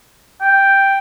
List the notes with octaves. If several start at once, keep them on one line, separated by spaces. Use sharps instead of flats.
G5